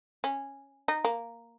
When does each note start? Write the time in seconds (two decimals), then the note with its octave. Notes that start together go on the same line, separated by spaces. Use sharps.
0.24 C#4
0.88 D#4
1.05 A#3